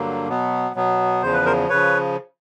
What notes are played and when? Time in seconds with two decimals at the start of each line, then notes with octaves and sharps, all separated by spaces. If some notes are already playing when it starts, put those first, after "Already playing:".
Already playing: G2 D3 F#3 A#3
0.28 B2 F#3 B3
0.75 B2 F#3 B3
1.22 E2 C#3 F3 C5
1.34 B4
1.45 A#4 C5
1.70 C#3 F3 B4 C#5